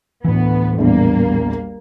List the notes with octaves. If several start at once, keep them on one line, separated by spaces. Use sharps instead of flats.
D2 A2 E3 B3
A#1 E2 G3 A#3